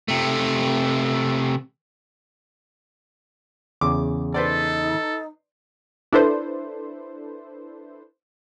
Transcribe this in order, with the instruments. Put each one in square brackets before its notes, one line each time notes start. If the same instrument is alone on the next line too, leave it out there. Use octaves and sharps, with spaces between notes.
[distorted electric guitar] C3 A3
[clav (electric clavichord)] E2 C#3 [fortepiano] D6
[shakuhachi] D#4 [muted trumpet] A4 [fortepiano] B4 C5 D5
[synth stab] D4 E4 A4 B4 C5